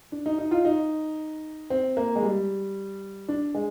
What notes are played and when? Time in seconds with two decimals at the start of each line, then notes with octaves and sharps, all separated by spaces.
0.12 D4
0.26 D#4
0.38 D#4
0.51 F4
0.65 D#4
1.70 C4
1.97 A#3
2.16 G#3
2.23 G3
3.28 D4
3.55 G#3